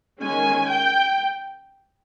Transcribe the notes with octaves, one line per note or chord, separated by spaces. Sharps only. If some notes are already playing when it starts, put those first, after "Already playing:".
D#3 G#3 C#4 G#5
G5